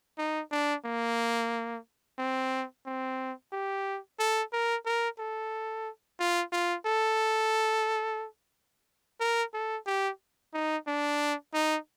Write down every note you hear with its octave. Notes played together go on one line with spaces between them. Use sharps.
D#4
D4
A#3
C4
C4
G4
A4
A#4
A#4
A4
F4
F4
A4
A#4
A4
G4
D#4
D4
D#4